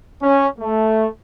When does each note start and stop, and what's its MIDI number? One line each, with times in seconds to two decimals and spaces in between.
0.22 0.47 61
0.59 1.08 57